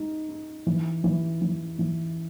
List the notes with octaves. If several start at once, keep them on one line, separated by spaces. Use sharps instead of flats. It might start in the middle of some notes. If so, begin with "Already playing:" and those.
Already playing: G#3 D#4
D#4
E3
E3
E3
E3